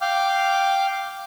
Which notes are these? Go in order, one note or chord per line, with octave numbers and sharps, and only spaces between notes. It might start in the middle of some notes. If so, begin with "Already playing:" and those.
F5 G5 D6 F6